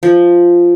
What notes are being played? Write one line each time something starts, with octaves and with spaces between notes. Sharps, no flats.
F3